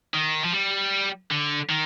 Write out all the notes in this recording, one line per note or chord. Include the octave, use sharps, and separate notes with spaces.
D#3
F3
G3
D3
D#3